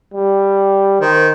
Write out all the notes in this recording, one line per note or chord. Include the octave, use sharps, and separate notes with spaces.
G3
D#3 C5